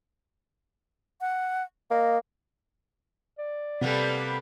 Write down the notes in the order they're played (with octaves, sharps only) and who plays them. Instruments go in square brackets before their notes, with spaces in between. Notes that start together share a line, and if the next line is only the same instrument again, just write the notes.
[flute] F#5
[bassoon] A#3 [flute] D#5
[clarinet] D5
[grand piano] C3 [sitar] G3 A#3 B3 [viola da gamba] A4 B4 C5